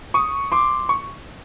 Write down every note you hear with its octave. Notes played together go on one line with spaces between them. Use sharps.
C#6 D#6
C6 D6
C#6